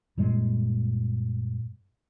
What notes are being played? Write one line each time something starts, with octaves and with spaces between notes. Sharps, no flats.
F#2 A#2 G3 G#3